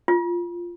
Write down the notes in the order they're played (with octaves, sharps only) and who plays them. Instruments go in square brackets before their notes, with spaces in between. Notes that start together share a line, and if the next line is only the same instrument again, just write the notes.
[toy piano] F4